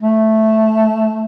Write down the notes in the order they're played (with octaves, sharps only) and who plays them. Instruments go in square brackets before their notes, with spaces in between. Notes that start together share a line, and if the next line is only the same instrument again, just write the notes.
[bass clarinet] A3